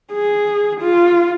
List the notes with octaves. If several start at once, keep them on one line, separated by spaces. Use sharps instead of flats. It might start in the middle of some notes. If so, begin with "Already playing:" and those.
G#4
F4